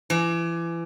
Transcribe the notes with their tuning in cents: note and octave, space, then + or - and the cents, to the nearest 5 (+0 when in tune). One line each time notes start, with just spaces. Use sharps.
E3 +30